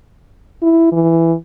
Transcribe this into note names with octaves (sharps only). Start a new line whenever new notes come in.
E4
E3